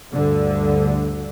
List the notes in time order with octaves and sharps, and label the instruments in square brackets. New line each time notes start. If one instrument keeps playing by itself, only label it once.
[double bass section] D2 G2 D3